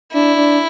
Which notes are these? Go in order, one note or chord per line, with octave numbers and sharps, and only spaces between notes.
D4 E4
D4